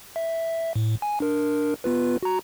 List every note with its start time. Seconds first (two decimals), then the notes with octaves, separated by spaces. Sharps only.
0.16 E5
0.76 A2
1.02 G#5
1.20 D4 A#4
1.84 B3 F4 B4
2.23 F#4 A#5